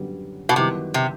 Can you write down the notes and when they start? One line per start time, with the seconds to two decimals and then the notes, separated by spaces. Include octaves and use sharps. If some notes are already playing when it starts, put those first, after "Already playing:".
Already playing: F#2 D3 G3 B3
0.49 B2
0.55 F#2 C3 D#3 G3 B3 E4
0.94 C3